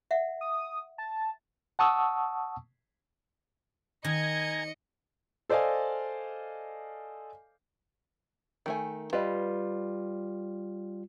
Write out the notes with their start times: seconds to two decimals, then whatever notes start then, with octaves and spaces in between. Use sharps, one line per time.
0.11 E5 F#5
0.41 D#6
0.98 A5
1.79 F#5 A5 C#6 D#6 E6
4.05 D#3 D#5 G#5 A#5 G#6 C#7
5.49 A4 C5 D5 D#5 F5 G#5
8.66 D#3 A3 G#5
9.13 G3 F4 B4 D#5